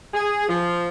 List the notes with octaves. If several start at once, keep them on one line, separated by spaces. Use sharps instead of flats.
G#4
F3